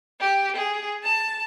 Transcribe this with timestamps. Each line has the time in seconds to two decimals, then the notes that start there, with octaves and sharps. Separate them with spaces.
0.21 G4
0.55 G#4
1.03 A5